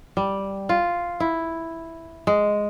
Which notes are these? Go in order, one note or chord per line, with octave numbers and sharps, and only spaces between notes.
G3
F4
E4
G#3